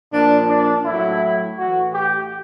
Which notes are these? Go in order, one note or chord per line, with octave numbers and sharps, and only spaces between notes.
A#2 F3 D4
D4
A2 F#3 E4
A2 E3 F#4
G4